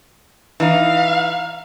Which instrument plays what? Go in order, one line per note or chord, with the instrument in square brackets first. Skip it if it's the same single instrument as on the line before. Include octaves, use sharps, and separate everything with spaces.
[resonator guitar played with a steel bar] E3 D#4 [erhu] F5